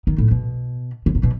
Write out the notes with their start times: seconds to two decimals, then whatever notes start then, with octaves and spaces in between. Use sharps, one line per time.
0.07 D#3
0.18 A2
0.31 B2
1.06 C#3
1.15 C3
1.23 B2